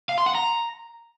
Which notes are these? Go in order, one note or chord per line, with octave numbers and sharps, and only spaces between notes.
F5
C6
F#5
A#5